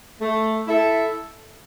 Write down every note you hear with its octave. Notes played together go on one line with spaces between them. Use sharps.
A3
E4 A4 E5